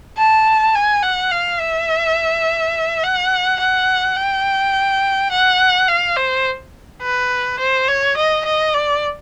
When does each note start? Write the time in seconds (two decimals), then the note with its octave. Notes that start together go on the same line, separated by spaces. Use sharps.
0.18 A5
0.75 G#5
1.03 F#5
1.31 F5
1.60 E5
3.03 F#5
3.60 F#5
4.16 G5
5.31 F#5
5.88 F5
6.17 C5
7.02 B4
7.59 C5
7.88 C#5
8.17 D#5
8.45 D#5
8.74 D5